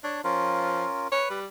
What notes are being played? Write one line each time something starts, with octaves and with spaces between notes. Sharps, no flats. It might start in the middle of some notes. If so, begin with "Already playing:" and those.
D4 C#5 A5
F3 C#4 F4 A#4
B4 C#5
G3